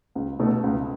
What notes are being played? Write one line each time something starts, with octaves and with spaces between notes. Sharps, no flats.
C#2
B2 A3
C#2